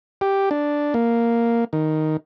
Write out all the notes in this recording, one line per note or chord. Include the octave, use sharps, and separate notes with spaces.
G4
D4
A#3
D#3